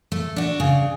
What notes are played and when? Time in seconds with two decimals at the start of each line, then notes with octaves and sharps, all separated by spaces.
0.12 A3
0.36 D4 F#4
0.60 C#3